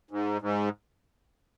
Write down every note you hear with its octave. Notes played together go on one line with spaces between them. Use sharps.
G#2
G#2